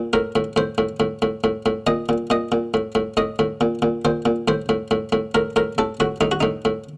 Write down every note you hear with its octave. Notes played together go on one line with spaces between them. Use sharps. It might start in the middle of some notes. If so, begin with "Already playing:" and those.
Already playing: A#2
A2 A#4
A2
A2 C5
A2
A2
A2
A2
A2
A#2 D#5
A#2
A#2 D#5
A#2
A2
A2
A2 D#5
A2
A#2
A#2
A#2 C5
A#2
A2 C5
A2
A2
A2
A2 A#4
A2 A#4
A2 A4
A2 F#4
A2 D#4
F#4
A2 D#4
A2